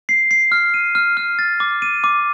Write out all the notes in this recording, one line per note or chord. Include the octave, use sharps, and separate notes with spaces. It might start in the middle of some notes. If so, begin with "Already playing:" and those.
C7
C7
F6
D#7
F6
F6
A6
D6
D#7
D6